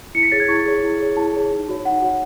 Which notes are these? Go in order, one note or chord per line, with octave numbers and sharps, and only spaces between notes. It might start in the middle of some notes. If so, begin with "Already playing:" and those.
E4 C#7
B6
G#4 C#5 A6
G#6
E4 C#6
G#4 C#5
E4
G#4 C#5
E4 A5
G#4 C#5
D#4
F#4 C#5
D#4 F#5
F#4 C#5